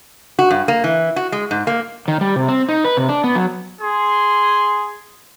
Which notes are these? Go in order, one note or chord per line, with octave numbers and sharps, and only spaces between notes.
F#4
G2
A#3
E3
F#4
G#3
G#2
A#3
D#3
G3
C3
C4
D#4
B4
C3
D4
B3
F#3
G#4 C6